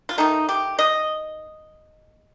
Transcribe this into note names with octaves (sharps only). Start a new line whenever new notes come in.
F4
D#3 A3 D#4
G4
D#5